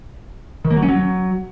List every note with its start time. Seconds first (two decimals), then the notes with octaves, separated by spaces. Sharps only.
0.65 D#3
0.71 A#3
0.77 F#3
0.83 C#4
0.88 F#3